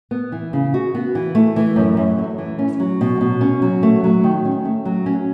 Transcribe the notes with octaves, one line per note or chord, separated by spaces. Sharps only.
B3
E3
C#3
F#4
B3
E3
A3
E3
F#2
F#2
A3
E3
C#4
F#3
B2
B2
C#4
F#3
A3
F#3
D#3
C#4
A3
F#3
C#4